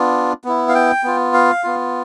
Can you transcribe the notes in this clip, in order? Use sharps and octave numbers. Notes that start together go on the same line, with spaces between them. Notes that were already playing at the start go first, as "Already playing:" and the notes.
Already playing: B3 D4 F4
B3 E4
F5
G5
B3 F4
F5
B3 F4